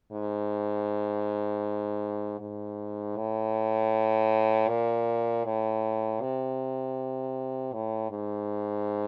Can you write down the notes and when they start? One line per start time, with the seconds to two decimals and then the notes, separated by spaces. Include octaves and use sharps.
0.12 G#2
2.40 G#2
3.17 A2
4.68 A#2
5.45 A2
6.21 C3
7.73 A2
8.11 G#2